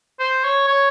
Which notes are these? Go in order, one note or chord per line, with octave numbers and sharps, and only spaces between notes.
C5
C#5
C#5